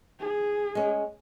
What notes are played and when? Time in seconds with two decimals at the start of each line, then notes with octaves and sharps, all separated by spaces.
0.19 G#4
0.75 G#3 C#4